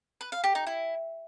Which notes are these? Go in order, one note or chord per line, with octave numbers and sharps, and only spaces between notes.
B4
F5
G4
D#4
E4